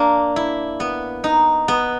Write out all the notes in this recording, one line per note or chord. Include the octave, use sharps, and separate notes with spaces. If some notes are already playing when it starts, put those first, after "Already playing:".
Already playing: A#3 D4
E4
B3
D#4
B3